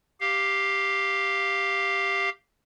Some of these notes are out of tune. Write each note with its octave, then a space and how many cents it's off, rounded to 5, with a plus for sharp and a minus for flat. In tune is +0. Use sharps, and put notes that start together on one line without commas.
G4 +0 F5 +0